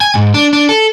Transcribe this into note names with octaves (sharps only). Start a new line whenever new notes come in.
G#5
G#2
D4
D4
A4